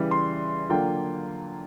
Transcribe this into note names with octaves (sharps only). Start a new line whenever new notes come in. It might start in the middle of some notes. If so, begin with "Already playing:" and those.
Already playing: C#3 E3 G3
C6
D3 F#3 A#3 D4 F4 G5